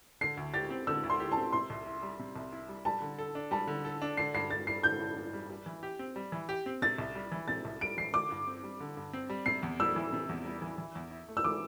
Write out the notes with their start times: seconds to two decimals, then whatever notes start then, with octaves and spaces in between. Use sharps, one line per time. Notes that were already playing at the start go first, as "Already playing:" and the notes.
0.21 D3 C7
0.37 D2
0.54 G4 A6
0.70 C4
0.87 D3 E6
1.04 D2
1.10 C6
1.20 G4
1.32 A5
1.37 C4
1.52 C3 C6
1.70 C2
1.86 E4
2.03 G3
2.19 C3
2.36 C2
2.53 E4
2.69 G3
2.85 G3 A5
3.02 D3
3.18 A4
3.35 D4
3.51 G3 A5
3.68 D3
3.85 A4
4.02 D4
4.17 D3 C7
4.34 G2 C7
4.50 G2 A6
4.67 G3 C7
4.83 D3 G6
5.00 G2
5.17 G2
5.33 G3
5.50 G3
5.66 E3
5.83 G4
5.99 C4
6.16 G3
6.32 E3
6.49 G4
6.66 C4
6.82 C3 A6
6.98 C2
7.15 G3
7.32 E3
7.48 C3 A6
7.65 C2
7.81 G3 D7
7.98 E3 C7
8.14 D3 D6
8.31 G2
8.47 C4
8.64 G3
8.80 D3
8.97 G2
9.13 C4
9.29 G3
9.46 C3 C7
9.63 E2
9.79 G3 E6
9.96 E3
10.13 C3
10.29 E2
10.45 G3
10.62 E3
10.78 E3
10.95 E2
11.11 E4
11.28 A3
11.37 E6
11.44 E3 D6